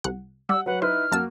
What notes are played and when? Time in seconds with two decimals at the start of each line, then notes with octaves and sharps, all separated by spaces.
0.04 C2 F#5
0.49 G3 F#5 E6
0.66 F#3 B4 F#5
0.82 D#4 E4 B4 C5 F6
1.12 F#2 A#3 F#4 A5 E6